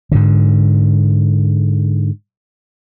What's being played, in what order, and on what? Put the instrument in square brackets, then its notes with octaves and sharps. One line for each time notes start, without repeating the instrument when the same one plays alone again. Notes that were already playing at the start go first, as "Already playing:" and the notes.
[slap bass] G#2 D3